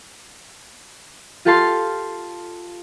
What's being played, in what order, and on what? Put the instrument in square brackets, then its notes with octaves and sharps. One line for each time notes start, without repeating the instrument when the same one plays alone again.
[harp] F4 G4 A4 F5 A5 C6